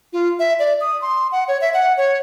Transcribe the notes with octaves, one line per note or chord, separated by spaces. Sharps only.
F4
E5
D5
D#6
C6
F#5
C#5
E5
F#5
C#5